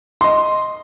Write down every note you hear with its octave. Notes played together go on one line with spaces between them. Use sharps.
D#5 C6